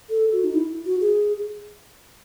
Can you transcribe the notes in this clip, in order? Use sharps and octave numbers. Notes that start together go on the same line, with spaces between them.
A4
F#4
D#4
E4
F#4
G#4